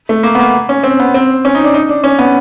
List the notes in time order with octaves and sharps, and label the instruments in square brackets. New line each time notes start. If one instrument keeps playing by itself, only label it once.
[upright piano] A3
A#3
B3
A#3
C#4
C4
B3
C4
C#4
D#4
D4
D#4
D4
C#4
B3